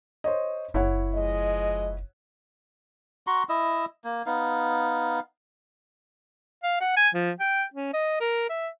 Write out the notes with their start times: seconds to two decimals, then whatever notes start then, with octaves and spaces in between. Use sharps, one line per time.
0.24 C5 C#5 D#5
0.74 F#1 E4 C#5 F#5
1.15 F3 G#3 D#5
3.27 F#4 A#5 C6 C#6
3.49 E4 D#5 E6
4.04 A#3
4.26 B3 D#4 F5
6.63 F5
6.81 F#5
6.97 G#5
7.14 F3
7.40 G5
7.74 C#4
7.93 D#5
8.20 A#4
8.49 E5